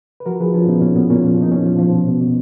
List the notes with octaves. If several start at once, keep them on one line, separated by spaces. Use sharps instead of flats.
B4
F3 F#4 A#4
F3 G#4 B4
F3 C#4 F4
A#2 B3 D#4
A#2 C#4
A#2 B3
A#2 C#4
F3
A#2 D#4
A#2 C#4
F3
F3
B2
B2
B2